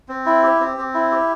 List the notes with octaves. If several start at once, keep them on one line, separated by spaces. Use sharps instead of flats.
C4
E4
G4
C4
C4
E4
G4